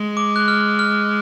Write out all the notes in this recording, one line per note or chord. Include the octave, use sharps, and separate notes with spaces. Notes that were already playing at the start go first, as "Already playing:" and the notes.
Already playing: G#3
D6
F#6
F6
F6